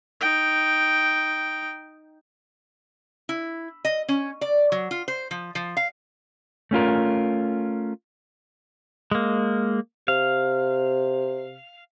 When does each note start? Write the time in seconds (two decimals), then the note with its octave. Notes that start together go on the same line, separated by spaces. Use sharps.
0.21 D#4 G5
3.29 E4
3.85 D#5
4.09 C#4
4.41 D5
4.72 F#3
4.91 F4
5.08 C5
5.31 F3
5.55 F3
5.77 F5
6.71 A3 C#4 F4 A#4
9.11 G#3 A#3
10.08 C3 F5